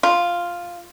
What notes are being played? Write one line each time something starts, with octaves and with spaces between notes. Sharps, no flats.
F4